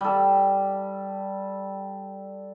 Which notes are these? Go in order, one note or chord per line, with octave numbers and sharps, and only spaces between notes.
G3 A4